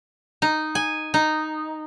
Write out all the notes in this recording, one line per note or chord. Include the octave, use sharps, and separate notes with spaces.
D#4
G#5
D#4